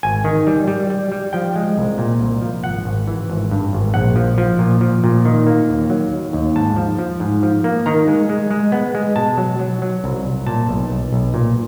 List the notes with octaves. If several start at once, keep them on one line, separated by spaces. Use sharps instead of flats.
G#1 G#5
D#3
G3
G3
G3
G3
F3 G5
G#3
C2
A#2
C2
F3
G#1 F#5
G#1
E3
G#1
G2
G#1
A#1 F#5
F3
F3
A#2
F3
A#2
D#3
A#3
D#2
F#3
D#2
D#2
G#2 A5
F3
F3
G#2
F3
A#3
D#3 A#5
G#3
G#3
G#3
B3
G#3
B2 A5
F#3
F#3
F#3
C2
C2
A#2 A5
B1
B1
B1
A#2